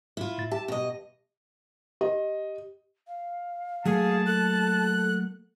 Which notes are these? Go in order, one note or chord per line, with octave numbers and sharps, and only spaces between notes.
E4 F4
A2 A6
G4 E5 A5
B2 D#5
G4 D#5
F5
F#3 A3 A#3 G#4 A5
A4 F#6